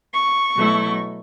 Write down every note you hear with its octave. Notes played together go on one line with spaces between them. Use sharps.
C#6
B2 F#3 A3 E4